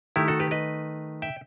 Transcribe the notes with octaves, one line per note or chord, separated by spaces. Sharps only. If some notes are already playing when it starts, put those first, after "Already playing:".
D#3 A3 E4 G4
F#4 A4
G4 B4
B4 D#5
E5 G5